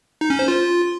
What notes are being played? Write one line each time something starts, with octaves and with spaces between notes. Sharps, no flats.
D#4
C#4
C5
F4